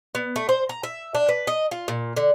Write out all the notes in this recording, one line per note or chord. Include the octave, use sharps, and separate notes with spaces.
B3
A3
C5
A#5
E5
D4
B4
D#5
F4
A#2
D3